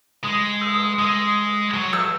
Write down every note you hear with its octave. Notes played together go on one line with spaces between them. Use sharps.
G#3 D#6
E6
D#6
G#3 D#6
F#3
E6